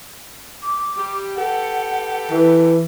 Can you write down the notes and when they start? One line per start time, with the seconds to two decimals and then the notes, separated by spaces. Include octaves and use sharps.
0.62 D6
0.97 G3 G4
1.36 G4 A4 B4 F#5
2.31 E3